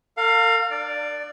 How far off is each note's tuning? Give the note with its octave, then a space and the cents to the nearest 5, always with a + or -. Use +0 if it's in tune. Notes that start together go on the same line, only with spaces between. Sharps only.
A#4 -45 F5 +15
D4 +35 D5 +0